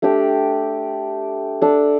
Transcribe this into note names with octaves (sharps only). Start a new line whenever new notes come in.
A3 D4 G4 D5
D4 A4 D5